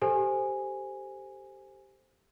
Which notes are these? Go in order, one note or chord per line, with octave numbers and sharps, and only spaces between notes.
G4 A4 C5 G#5